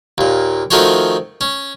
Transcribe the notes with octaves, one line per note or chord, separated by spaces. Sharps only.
D#2 A#2
D#3 F3 A3 F#4 C5 C#5
C#4